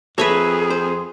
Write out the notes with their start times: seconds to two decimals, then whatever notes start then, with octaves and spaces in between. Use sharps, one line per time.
0.18 F2 G#4 A4 B4 C#5 E5 A#5
0.70 C5